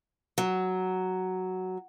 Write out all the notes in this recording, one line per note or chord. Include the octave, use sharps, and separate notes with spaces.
F#3